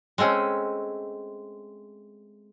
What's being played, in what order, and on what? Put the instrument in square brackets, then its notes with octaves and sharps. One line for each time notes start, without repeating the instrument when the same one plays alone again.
[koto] G#3 A3 C4 C#4